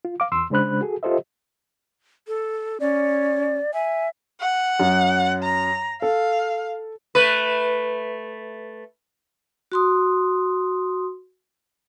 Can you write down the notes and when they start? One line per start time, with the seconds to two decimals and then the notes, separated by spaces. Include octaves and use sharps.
0.05 F4
0.20 F5 D6
0.32 E2 C6 E6
0.50 C#3 G#3 D4 C5 B5 F#6
0.81 F#4 G#4 A4
1.03 F4 G4 A4 C5 D#5 E5
2.27 A4
2.80 C#4 D5
3.74 E5 G#5
4.41 F#5
4.80 F#2
5.44 A#5
6.02 A4 F5
7.15 A3 B4
9.72 F#4 C6 D#6